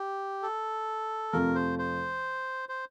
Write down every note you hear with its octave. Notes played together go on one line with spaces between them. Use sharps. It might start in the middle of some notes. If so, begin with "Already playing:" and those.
Already playing: G4
A4
F2 C3 F3 A3 A#4
C5
C5
C5